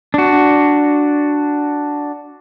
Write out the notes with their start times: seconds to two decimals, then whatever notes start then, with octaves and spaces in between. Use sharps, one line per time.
0.14 D4 F#4